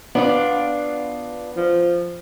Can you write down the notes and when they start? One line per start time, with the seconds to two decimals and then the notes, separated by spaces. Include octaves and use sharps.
0.15 B3 D4 F4 D5
1.57 F3